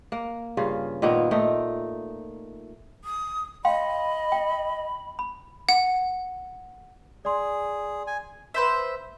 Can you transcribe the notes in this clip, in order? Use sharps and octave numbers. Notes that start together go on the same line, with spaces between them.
A#3
G2 C#3 F4
A#2 D#3 A#3 B3
A#2 A3 D#4
D#6
D#5 F5 G5 B5 C6
G5
B5
F#5
G#4 D5 C6
G#5
B4 C5 E5